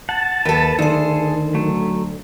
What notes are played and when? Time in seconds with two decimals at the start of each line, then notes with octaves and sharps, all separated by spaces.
0.09 F#5 A5
0.45 D#2 A4 B4
0.79 D2 D#3 G#4 A4 C5
1.54 F#3 A3